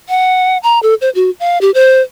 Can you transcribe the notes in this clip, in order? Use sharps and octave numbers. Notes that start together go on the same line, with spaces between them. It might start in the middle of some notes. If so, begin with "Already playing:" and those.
F#5
A#5
A4
C5
F#4
F5
G4
C5